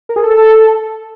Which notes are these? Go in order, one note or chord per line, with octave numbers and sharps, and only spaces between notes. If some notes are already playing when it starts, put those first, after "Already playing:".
A#4
G#4
A4